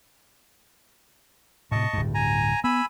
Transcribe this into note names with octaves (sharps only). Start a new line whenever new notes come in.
A2 C3 D#5 A5 C#6
D1 G2
G#5 A#5
B3 G#5 B5 E6